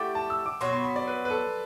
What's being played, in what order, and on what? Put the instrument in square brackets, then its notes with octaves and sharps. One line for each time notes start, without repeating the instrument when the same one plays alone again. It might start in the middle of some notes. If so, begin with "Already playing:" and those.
Already playing: [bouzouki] A3 E4 G4 D5 [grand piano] F#5 G5
[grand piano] A5
E6
D6
[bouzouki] B2 F#3 B3 F#4 [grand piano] C6
[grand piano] C6
B5
D5
B4
B4
A4